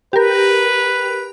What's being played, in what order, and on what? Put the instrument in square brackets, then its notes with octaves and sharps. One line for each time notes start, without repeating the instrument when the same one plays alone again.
[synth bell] G4 A#4 [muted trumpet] B4